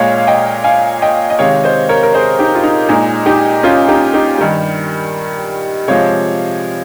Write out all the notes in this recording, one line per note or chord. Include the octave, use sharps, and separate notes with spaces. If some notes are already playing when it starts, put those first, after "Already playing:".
Already playing: A#2 G#3 C#5 F5
F5
D#5 G5
F5 G#5
D#5 G5
D#5
C3 D#3 G#3 C#5 F5
C5 D#5
A#4 C#5
A#4
G#4 C5
D#4 G4
F4
D#4
A#2 G#3 D#4
D#4 G4
C#4 F4
D#4 G4
D#4 G4
G2 D#3 G3
C3 F3 G#3 C#5 F5